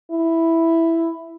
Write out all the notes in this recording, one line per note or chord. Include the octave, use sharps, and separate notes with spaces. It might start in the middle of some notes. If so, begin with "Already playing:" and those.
E4